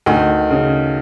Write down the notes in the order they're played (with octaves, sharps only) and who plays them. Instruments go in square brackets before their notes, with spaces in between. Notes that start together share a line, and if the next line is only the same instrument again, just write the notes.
[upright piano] D2 [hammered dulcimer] D#3
[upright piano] C#3